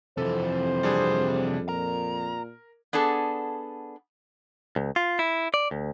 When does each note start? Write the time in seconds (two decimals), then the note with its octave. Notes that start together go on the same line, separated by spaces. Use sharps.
0.18 F2 C3 E3 A4 C5
0.83 G3 D4 G#4
1.69 A#2 A#4 A#5
2.93 B3 D4 G#4 A4
4.76 C#2
4.96 F4
5.19 E4
5.54 D5
5.71 D2